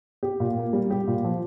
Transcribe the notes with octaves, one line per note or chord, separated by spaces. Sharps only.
G4
A#2
A#3
G3
G4
A#2
F3